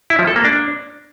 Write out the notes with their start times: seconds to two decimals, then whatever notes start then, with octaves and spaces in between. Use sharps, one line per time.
0.10 E4
0.19 F3
0.27 A4
0.36 A#3
0.44 D4